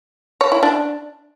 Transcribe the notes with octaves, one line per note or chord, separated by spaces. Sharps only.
C#5
E4
D4